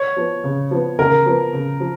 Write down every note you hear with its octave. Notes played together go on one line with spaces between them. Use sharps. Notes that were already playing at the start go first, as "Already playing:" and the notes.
Already playing: C#5
F3 B3
C#3
F3 B3
C#3 A#4
F3 B3
C#3
F3